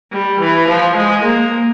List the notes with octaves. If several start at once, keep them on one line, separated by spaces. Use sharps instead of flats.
G3
E3
F3
G#3
A#3